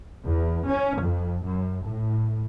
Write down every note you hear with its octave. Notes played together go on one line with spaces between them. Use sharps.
E2
C#4
F2
F#2
A2